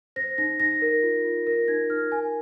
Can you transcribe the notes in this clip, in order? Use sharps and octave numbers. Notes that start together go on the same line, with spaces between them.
C5 A#6
D#4 A#6
D#4 A#6
A#4
F4
F4
A#4 A#6
D#4 G#6
D#4 F6
A#4 G#5